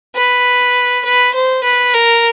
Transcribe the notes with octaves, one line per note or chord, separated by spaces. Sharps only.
B4
B4
C5
B4
A#4